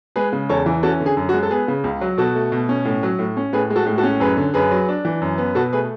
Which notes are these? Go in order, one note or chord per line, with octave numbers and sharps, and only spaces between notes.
G#3 G#4 B4
C#3
E2 A4 C#5
E3
C#4 F#4 A4
D3
G#4
F#2
F#4
G#3
A4
B3 G#4
C#3
C#2
F#3
B2 F#4 A4
A3
B2
C#4
A2
F#3
A2
C#4
A2 G#4 B4
G#3
F#4 A4
A2
F#4 A4
C#4
F#2 G#4 B4
D3
F#2 G#4 B4
F#3
D4
E3
F#2
B3
B2 F#4 A4
A3 G#4 B4